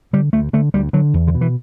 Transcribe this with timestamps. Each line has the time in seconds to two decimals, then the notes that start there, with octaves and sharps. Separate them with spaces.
0.13 D3 G3
0.33 D2 A3
0.53 D3 A3
0.74 D2 G3
0.93 D3 F#3
1.14 E2
1.27 D3
1.35 B2
1.41 E3